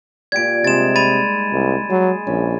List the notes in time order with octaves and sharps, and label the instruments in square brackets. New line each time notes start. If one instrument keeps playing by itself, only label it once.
[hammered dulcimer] A#2 G4 D5 [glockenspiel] G#6 D7
[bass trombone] C3 [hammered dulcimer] G3 G#3 D#4 [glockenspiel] A6 E7
[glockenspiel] B5 A6 D#7
[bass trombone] C2
[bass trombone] F#3 [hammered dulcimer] G#4
[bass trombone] A#1 [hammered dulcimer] C#4